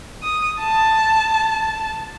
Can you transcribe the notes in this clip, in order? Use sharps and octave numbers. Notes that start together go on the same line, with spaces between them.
D#6
A5